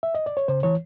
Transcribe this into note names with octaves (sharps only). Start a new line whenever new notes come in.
E5
D#5
D5
C#5
C#3 C5
E3 C#5